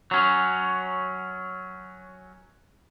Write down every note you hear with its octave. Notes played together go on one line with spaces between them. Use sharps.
F#3 C#4